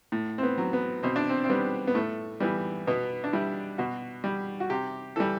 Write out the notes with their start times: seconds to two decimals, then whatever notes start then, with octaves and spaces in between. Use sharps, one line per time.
0.12 A2
0.38 C4
0.43 B3
0.58 F#3
0.73 B3
1.03 B2 C4
1.16 D4
1.29 C4
1.44 C4
1.49 G3 B3
1.87 B3
1.95 A2 A3
2.40 E3 G3 B3
2.87 B2 B3
3.24 D4
3.33 G3 E4
3.78 B2 F#4
4.24 G3
4.60 F#4
4.70 C3 G4
5.16 E3 G3 A4